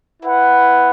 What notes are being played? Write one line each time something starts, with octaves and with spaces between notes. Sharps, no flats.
E4 B4 F#5